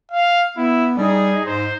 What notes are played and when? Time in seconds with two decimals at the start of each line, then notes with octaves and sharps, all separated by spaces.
0.12 F5
0.57 B3 E4
0.97 G3 D#4 G#4
1.46 G#2 C5